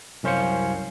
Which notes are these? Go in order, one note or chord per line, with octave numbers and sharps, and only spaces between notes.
C2 F#2 C#4 C5 F5 C#7